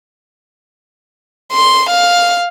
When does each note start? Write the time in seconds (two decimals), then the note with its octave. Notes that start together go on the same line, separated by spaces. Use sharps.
1.53 C6
1.89 F5